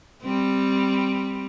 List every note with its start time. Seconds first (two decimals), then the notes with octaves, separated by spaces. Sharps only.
0.23 G3 C4